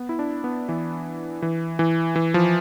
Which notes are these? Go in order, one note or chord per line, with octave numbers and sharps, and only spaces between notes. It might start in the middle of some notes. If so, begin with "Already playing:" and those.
Already playing: B3
E4
D4
B3
E3
E3
E3
E3
F3